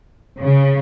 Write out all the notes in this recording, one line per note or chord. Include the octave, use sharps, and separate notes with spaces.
C#3